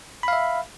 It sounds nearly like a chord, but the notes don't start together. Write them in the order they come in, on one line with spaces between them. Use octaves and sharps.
B5 F5 E5